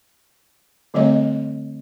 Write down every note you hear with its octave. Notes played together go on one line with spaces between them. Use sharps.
D3 G3 A3 C4 C#5 D#5